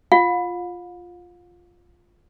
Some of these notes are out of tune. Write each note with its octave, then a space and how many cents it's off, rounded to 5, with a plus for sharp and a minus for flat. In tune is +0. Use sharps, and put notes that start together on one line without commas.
F4 +0 F5 +40